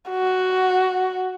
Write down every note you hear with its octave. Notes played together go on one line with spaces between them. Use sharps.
F#4